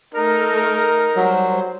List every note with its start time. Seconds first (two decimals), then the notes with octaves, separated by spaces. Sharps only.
0.14 A3 D#4 A4 A#4
1.16 F#3 G3 C5